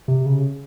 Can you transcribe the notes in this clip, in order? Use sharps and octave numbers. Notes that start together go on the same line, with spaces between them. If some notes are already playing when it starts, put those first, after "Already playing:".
C3
C#3